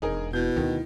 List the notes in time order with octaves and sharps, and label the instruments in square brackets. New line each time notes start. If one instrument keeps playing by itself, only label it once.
[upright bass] E1 [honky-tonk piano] D#4 G#4 A#4
[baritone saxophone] B2 [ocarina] E4 [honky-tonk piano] G6
[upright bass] D2 F4 [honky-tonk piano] D#3